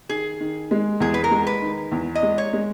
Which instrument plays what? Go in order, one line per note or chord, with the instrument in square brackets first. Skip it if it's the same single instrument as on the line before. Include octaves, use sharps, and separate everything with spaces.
[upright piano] D#3 [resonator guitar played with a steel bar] G#4
[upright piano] D#3
G#3
[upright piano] E2 [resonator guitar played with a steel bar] G#4
[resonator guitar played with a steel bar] B4
A#4
[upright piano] G#3
[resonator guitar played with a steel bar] B4
[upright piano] D#3
E2
[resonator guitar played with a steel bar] D#5
[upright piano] G#3
[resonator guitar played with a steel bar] C#5
[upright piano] G#3